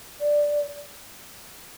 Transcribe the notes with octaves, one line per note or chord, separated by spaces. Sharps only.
D5